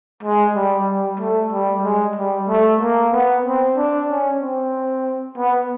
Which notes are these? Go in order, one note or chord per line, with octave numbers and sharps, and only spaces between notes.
G#3
G3
G3
A3
G3
G#3
G3
A3
A#3
B3
C4
D4
C#4
C4
B3